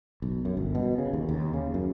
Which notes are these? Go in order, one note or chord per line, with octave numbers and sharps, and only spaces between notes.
B1
F#2
G1
B2
C#3
D#2
D#2
C#3
F#2